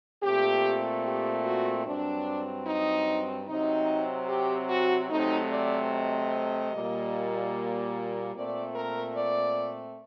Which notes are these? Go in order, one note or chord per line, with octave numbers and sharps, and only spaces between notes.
A#2 A3 C4 G4
G4
F#4
G2 F#3 C4 D4
D#4
C3 F#3 C4 D#4
G4
F#4
C3 F#3 A3 C4 D#4
D5
D#5
A#2 G3 A#3
A#2 A3 C4 D5
A#4
D5